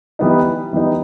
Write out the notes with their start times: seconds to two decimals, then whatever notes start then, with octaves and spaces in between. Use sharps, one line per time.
0.19 E3 G3 B3 D#4
0.73 E3 G3 B3 D#4